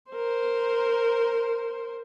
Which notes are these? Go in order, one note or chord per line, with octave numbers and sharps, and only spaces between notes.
A#4 C5